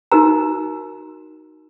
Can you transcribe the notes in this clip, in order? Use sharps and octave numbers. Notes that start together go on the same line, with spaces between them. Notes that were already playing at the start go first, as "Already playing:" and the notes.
D#4 F#4 A#4 A#5